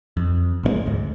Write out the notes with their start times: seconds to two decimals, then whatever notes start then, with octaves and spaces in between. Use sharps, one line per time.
0.17 F2
0.63 A#1 D3 G#3
0.86 D2 G#2